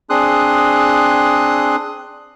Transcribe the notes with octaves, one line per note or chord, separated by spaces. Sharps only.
C4 D4 G#4 C6 D#6 F#6